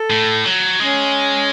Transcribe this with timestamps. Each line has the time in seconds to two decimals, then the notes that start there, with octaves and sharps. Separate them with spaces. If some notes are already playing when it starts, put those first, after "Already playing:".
Already playing: A4
0.10 A2
0.45 F#3
0.80 G#3 C#4